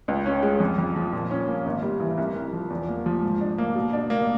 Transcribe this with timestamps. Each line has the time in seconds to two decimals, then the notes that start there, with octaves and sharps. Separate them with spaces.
0.08 C#2
0.26 C#4
0.43 G#3
0.60 F2
0.78 F2
0.96 F3
1.13 A#2
1.31 C#4
1.48 A#3
1.66 G#1
1.83 G3
2.00 E3
2.18 C2
2.35 C2
2.53 F3
2.70 E2
2.88 A#3
3.06 F3
3.22 G#2
3.41 D4
3.58 A#3
3.75 B2
3.93 D4
4.10 A#3